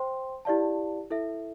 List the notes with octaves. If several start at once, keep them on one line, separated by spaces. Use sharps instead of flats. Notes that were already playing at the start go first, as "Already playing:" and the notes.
Already playing: C5 G5 C6
E4 G4 D5 F5 A5
E4 A4 E5